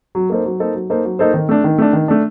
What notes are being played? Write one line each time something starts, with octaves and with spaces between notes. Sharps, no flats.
F#3
A#3 D#4 A4 C5
F#3
A#3 D#4 A4 C5
F#3
A#3 D#4 A4 C5
F#3
A#3 D#4 A4 C5
D#3
A3 D4
D#3
A3 D4
D#3
A3 D4